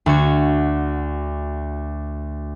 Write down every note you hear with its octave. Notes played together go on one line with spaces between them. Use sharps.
D2 F#4 G#6